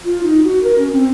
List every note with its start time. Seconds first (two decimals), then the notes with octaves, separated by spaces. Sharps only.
0.04 F4
0.23 D#4
0.43 F#4
0.63 A#4
0.78 C#4
0.92 C4